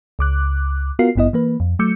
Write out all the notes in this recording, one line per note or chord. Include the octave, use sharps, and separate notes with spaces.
C#2 D6 F#6
B3 F4 F#4 A#4 F5 C7
G#1 G2 B3 E4 D#5
E3 A#3 B4
F2
F#3 A3 D6 E6 G6 C#7